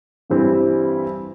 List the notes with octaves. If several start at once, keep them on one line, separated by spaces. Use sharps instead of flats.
G2 E3 G3 C4 E4